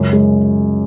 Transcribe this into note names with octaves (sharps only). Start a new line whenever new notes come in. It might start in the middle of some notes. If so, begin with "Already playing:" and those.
Already playing: C#2 F#2
G#3